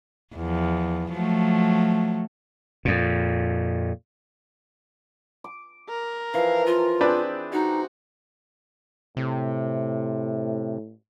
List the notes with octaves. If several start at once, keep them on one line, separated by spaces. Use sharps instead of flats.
E2 F3
F3 F#3 A3
F2 A#2
D6
A#4
E3 F3 F5
F4
C4 D4 G4 G#4 B4
D#4 F#4
A2 C3